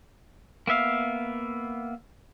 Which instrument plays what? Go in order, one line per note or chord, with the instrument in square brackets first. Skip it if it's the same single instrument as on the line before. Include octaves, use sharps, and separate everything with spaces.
[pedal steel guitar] A#3 B3 E5 F5